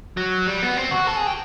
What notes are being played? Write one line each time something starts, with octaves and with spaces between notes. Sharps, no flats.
F#3
G3
B3
C4
F#4
A4
G#4
G4